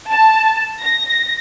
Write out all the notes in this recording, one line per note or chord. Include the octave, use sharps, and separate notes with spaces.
A5
A#6